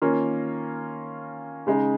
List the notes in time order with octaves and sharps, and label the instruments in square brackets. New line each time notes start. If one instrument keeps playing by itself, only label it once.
[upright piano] D#3 A#3 C#4 F4 A#4
C#3 G#3 D#4